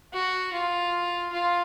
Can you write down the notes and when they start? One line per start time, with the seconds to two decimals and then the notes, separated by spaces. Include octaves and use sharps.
0.13 F#4
0.53 F4
1.33 F4